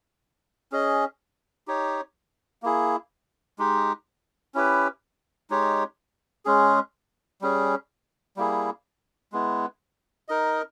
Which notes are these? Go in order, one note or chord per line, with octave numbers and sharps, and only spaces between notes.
C#4 G#4 D#5
D#4 G4 C#5
A#3 E4 G#4
G#3 D#4 G4
C#4 E4 G4 B4
G#3 D#4 G4 C#5
G#3 C#4 G#4
G3 C#4 G#4
G3 A#3 E4 G#4
G#3 B3 E4
D#4 A#4 D#5